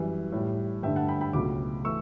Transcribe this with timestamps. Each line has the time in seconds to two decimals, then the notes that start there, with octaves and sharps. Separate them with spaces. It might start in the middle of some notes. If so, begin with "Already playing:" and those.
Already playing: F#2 E3 G3
0.32 A2 G3
0.83 G2 D3 A3 E5 G5
0.96 F#5 A5
1.08 G5 B5
1.21 G5 B5
1.33 C#2 B2 F#3 A3 B5 D6
1.84 E3 A3 C#6 E6